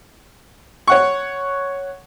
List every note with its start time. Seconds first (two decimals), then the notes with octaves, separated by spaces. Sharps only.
0.88 C#5 F#5 C#6